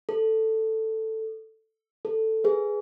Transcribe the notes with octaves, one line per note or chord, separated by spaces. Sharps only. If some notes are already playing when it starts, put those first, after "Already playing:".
A4
A4
G#4 B4